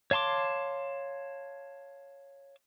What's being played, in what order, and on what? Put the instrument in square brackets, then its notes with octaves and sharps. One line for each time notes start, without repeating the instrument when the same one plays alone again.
[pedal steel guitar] C#5 F5 A5 C6 D6